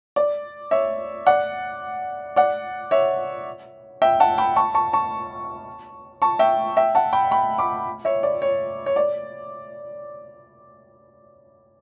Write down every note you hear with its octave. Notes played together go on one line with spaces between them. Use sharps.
D5
C#5 E5
D5 F#5
D5 F#5
C#5 E5
E5 G5
F#5 A5
G5 B5
A5 C#6
A5 C#6
A5 C#6
A5 C#6
E5 G5
E5 G5
F#5 A5
G5 B5
G5 B5
B5 D6
C#5 E5
D5
C#5
C#5
D5